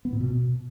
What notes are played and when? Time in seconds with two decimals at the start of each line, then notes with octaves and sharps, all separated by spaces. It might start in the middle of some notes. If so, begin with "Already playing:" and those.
0.05 B3
0.13 A#2
0.20 B2